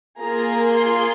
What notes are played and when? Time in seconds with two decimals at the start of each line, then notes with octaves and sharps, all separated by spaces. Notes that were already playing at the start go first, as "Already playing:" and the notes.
0.20 A#3 F4 G#4 A#5
0.71 C6